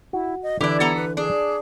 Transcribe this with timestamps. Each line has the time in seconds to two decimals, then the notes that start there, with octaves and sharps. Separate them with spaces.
0.13 E4 F#4
0.43 D#5
0.61 D3 E3 D4 E4 G4
0.80 B3 A4 A#5
0.96 B4
1.17 D4 G#4